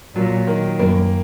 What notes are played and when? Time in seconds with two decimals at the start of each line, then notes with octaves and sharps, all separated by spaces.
0.16 A#2 F#3
0.47 D#3
0.79 F#2 A#3